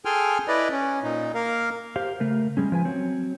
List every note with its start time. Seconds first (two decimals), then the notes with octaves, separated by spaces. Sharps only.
0.05 G#4 A4 G5 G#5 C6 F6
0.48 E4 B4 D5 D#5
0.71 C#4
1.03 A#2 D#4
1.35 A#3 A#4 F5
1.96 G4 C5 F5
2.20 C#3 A3 A#4
2.57 G3 G#3 C#4
2.72 F3 B4 G#5
2.85 F#3 C4 C#5